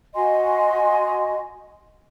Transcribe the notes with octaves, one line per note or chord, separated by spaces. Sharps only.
F#4 D#5 G#5 C6